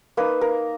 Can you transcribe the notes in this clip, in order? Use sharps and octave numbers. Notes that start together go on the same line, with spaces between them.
A#3 D#4 B4
A#4